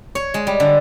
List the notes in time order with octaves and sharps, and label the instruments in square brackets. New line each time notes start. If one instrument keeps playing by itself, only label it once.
[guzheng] C#5
G#3
G3
D3